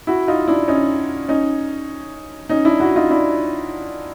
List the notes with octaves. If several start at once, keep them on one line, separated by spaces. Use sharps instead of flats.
E4 F#4
D#4 F4
D4 E4
C#4 D#4
C#4 D#4
C#4 D#4
D4 E4
E4 F#4
D#4 F4
D4 E4